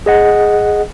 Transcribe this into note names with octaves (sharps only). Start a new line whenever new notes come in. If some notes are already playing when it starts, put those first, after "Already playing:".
G#4 D#5 F#5